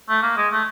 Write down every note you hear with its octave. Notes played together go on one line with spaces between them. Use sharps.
A3
A#3
G#3
A3